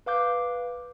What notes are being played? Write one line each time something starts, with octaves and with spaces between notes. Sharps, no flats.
B4 F5 D6 G6